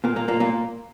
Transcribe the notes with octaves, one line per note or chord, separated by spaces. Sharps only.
A#2 A#3
A#2 A#3
A#2 A#3
A#2 A#3